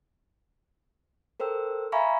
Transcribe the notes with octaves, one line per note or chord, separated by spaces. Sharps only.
A4 A#4 C5 G5 E6
E5 F5 G#5 A#5 B5 C#6